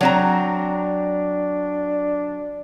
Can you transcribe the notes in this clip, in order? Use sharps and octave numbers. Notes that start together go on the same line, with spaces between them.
F#3 C4 D4 A#5